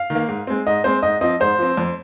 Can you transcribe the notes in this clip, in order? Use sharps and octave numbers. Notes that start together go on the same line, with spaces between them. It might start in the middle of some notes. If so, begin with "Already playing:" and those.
Already playing: F5
D#3
A#3
G#2
G#3 C4
G#2 D#5
G#3 C4 C5
G#2 D#5
F3 C4 D#5
G#2 C5
F3 C4
F2